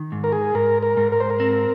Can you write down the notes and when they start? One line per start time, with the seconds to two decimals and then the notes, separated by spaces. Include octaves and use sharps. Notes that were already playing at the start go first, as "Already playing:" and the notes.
Already playing: D#3
0.12 G#2
0.24 A#4
0.32 G#4
0.54 G#2 A#4
0.83 A#4
0.97 G#2
1.12 A#4
1.20 C5
1.30 A#4
1.40 C4